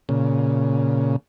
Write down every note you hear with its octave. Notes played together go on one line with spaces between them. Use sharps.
A#2 C#3